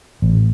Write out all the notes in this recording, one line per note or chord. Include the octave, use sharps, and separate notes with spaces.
A1